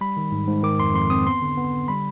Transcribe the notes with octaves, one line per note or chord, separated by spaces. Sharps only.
G3 B5
D#3
G#2
G#2
D#3 D6
F2 C6
F2 C6
C4 D#6
B3 C6
D3
B3
D3
G3 B5